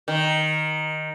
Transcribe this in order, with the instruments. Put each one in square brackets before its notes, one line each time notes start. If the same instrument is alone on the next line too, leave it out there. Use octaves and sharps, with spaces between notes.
[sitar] D#3